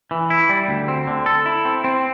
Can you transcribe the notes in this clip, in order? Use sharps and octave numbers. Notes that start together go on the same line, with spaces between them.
E3
E4
G3
D2
C4
D3
A4
E4
C4
C4